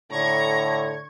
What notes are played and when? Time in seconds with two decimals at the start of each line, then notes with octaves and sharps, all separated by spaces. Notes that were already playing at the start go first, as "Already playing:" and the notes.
0.12 A2 D3 A#5 C#6 G#6